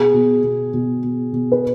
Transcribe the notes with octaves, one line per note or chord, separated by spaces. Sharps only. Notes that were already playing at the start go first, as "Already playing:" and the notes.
Already playing: B2 G#4
B2
B2
B2
B2
B2
B4